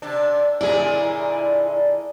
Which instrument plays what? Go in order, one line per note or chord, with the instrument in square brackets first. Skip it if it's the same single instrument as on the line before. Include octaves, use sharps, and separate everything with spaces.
[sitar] C3 D4
[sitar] A#2 D3 G#3 [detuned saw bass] E4 [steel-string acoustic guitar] G#4 D5